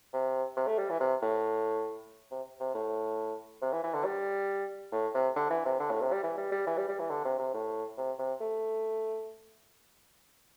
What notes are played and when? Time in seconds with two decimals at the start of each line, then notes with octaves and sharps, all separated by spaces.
0.13 C3
0.57 C3
0.67 A3
0.78 G3
0.89 E3
1.00 C3
1.22 A2
2.31 C3
2.60 C3
2.74 A2
3.62 C3
3.73 E3
3.84 E3
3.94 D3
4.05 G3
4.92 A2
5.14 C3
5.36 D3
5.50 E3
5.65 C3
5.79 D3
5.91 A2
6.01 C3
6.12 G3
6.23 E3
6.37 G3
6.52 G3
6.67 E3
6.78 G3
6.88 G3
6.99 E3
7.10 D3
7.25 C3
7.39 C3
7.54 A2
7.97 C3
8.19 C3
8.41 A3